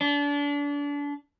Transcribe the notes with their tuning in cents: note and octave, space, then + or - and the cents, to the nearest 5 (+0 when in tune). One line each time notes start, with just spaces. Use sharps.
D4 -30